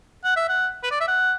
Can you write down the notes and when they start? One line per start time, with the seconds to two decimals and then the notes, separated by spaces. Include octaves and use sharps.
0.24 F#5
0.37 E5
0.49 F#5
0.84 B4
0.91 D5
1.00 E5
1.08 F#5